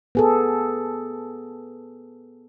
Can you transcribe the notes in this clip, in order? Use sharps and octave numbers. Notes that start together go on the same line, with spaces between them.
B3 G#4 A4